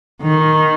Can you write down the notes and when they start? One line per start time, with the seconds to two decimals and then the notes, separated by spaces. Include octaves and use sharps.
0.22 D#3